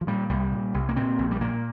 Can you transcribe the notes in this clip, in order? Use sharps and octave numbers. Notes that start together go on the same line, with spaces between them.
F3
A#2 G3
C2 G3
A#2
C2
A#3
A#2 C4
A#1
G3
A#2 A#3